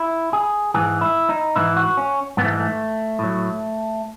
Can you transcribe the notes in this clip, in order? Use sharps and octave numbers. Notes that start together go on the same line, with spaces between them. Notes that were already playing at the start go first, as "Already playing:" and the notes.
Already playing: E4
G#4
G#2 E3 G#4
E4
D#4
G#2 E3 E4
F#4
C#4
G#2 E3 A3 B3
G#3
A3
A2 F#3